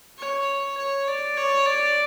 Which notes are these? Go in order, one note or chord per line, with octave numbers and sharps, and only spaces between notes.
C#5
C#5
D5
C#5
D5